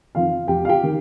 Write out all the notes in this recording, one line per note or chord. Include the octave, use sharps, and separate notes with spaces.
F2 D#3 F4 F5
F1 G4 G5
F5
G4 G5
D#3